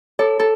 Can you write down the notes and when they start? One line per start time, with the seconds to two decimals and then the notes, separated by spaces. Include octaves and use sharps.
0.19 A4 C#5
0.39 A4